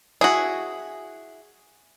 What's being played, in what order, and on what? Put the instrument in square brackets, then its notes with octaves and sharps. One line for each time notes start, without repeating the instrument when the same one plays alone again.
[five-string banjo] E4 F#4 [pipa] G#4